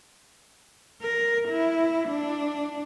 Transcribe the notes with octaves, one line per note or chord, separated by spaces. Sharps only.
A#4
E4
D4